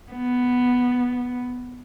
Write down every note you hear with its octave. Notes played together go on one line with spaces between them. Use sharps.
B3